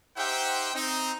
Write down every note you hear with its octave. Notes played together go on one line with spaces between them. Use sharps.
D#4 G4 C5 E5 F#5 G5
C4 D#4